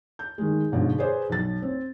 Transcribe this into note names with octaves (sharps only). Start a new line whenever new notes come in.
G6
D#3 G#3
G#2 B2 D3 F3
G#4 B4 C5 D5
B1 A6
C4